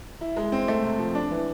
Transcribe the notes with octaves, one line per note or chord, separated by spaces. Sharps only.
E4
G#3
C4
A3
C3
F3
D4
E3